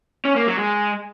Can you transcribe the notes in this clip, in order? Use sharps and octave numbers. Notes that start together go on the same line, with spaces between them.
C#4
A#3
F#3
G#3